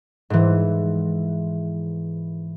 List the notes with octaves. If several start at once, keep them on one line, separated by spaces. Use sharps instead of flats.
G#2 E3